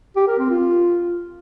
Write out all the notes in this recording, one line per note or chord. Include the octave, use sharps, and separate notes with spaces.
G4
A#4
C4
F4